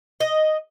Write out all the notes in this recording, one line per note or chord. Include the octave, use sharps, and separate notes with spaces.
D#5